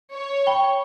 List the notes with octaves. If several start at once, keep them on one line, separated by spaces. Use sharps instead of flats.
C#5
G5 B5 G7